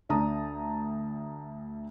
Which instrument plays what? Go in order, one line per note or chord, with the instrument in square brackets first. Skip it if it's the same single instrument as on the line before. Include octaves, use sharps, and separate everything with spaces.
[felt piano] D2 D4 A5 A#5 D#6